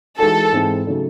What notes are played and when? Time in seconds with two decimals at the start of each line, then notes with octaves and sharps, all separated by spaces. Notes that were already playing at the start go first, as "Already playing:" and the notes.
0.19 E3 G#3 D#4 F#4 A4
0.52 G#2 E3 G#3 C4
0.87 C#3 F#3 A3 D#4